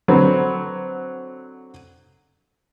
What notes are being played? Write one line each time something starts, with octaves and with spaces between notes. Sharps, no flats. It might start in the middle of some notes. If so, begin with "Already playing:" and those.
D3 F#3 C4 B4